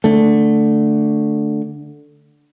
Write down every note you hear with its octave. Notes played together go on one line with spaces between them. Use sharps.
D3 A3